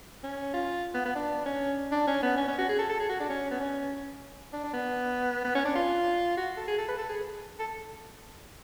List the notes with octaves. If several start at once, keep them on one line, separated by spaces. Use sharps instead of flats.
C#4
F4
B3
B3
D4
C#4
D4
C#4
B3
C#4
C#4
F#4
G#4
A4
A4
G#4
F#4
D4
C#4
B3
C#4
D4
D4
B3
B3
C#4
D4
F4
F#4
A4
G#4
A4
B4
A4
G#4
A4